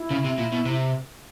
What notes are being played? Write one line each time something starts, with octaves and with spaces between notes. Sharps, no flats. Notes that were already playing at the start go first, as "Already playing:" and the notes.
Already playing: E4
C#3
C3
A#2
B2
C3